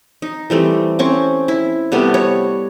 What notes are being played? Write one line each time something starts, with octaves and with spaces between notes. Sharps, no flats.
D#4
E3 G3 A3 C4
C4 C#4 C#6
E4
C3 G3 A3 B3
C#5